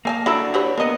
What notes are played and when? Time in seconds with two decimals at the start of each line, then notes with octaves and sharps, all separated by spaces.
0.05 A3 A#3 G#5 A5
0.26 D4 E4 F#4 A4 A#5
0.54 G4 B4 C#5
0.78 A#3 B3 A#4 D#5